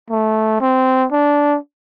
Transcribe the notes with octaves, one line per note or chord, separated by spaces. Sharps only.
A3
C4
D4